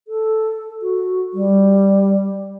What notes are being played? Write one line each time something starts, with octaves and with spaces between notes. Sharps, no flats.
A4
F#4
G3